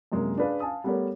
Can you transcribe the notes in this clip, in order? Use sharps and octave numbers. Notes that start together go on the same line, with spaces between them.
F#2 C3 G#3 A#3
D4 G#4 B4 F5
F5 G#5 A5 D#6
G3 A3 B3 G4 A#4 C#5